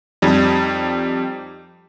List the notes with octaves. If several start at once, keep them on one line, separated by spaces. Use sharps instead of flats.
F2 G3 D#4